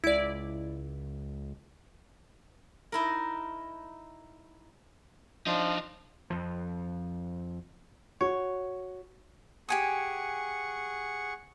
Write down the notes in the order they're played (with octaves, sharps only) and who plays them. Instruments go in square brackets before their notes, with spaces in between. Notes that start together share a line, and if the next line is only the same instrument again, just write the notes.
[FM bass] C#2 [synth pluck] E4 D5
[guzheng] D#4 E4 A#4
[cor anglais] F3 [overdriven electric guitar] D4 D#4
[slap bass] F2 F3
[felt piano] F#4 [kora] C#5
[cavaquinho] G4 G#5 D#6 [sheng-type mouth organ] G#4 F#5 C#6